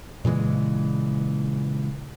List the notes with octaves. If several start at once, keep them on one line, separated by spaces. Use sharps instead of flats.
A#2 C#3 E3 G#3